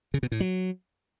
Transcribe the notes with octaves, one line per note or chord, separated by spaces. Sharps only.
C#3
B2
A2
F#3